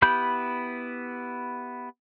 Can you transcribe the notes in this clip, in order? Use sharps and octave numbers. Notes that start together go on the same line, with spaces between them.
B3 E4 G4 B5 G6